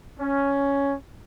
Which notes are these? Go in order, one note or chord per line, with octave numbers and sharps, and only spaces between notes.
C#4